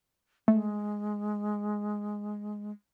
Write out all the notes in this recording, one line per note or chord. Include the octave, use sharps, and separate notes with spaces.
G#3 A3